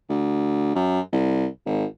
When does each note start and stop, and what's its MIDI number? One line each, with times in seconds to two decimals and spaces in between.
0.09 0.71 38
0.75 1.00 42
1.13 1.47 36
1.66 1.85 32